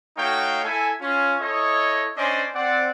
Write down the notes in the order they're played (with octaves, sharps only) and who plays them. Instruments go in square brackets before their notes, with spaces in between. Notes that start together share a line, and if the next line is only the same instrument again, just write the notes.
[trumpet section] A3 D#4 F#4 C#5 F5 G5
E4 A4 E5 G#5
C#4 F4
E4 A4 C#5 D#5
C#4 D4 C5 D5 D#5
C4 D5 F#5